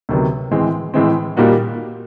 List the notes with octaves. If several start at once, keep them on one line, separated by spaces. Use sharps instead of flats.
D2 C3 D#3 F#3 B3
A2 E3 G#3 C4
A2 E3 G#3 C4
A#2 G3 A#3 D#4 F#4